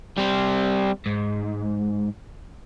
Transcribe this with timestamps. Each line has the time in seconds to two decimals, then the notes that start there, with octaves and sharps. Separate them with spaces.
0.18 G3 C4
1.06 G#2